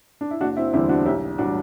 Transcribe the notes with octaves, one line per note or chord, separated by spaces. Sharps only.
D4
E4
F#1 D4 F#4
C4 E4
E2 D3 G3 C4 E4
D4 F#4
B1 E4 G4
A2 E3 G3 D4 F#4